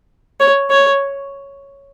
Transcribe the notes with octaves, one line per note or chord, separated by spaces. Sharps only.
C#5
C#5